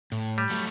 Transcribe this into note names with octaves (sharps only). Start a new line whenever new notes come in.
A2
G3
F#3 A3